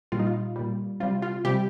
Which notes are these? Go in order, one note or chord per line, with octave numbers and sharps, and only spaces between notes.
A#2 G3 F4
D#4
F4
A#2 G3
C3 G3 F4
F4
C3 G3 G4